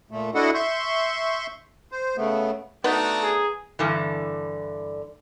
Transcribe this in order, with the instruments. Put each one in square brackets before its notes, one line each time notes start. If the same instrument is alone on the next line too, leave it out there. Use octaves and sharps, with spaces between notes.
[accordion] A#2 A3
D4 E4 F#4 A4 D#5 F#5
E5 C6 C#6 G6
C5
C#3 A3 B3
[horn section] A3 D4 F#4 [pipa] B3 D#4
[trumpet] G#4
[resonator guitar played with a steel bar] G2 D3 E3